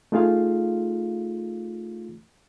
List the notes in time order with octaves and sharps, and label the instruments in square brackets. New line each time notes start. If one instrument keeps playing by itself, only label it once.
[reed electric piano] A3 D#4 F4 G#4 F5